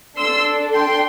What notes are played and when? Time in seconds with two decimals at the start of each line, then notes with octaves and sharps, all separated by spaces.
0.17 D4 A4 C6 E6
0.74 G5 C6